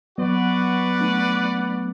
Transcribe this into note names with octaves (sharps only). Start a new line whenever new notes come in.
F#3 B3 F#4 B4 D5 F#5
A3 D4